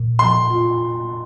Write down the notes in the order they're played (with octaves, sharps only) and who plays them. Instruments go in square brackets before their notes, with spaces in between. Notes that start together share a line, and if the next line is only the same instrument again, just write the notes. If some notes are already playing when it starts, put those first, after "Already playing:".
Already playing: [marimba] A#2
[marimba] F3 [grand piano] C6
[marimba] F4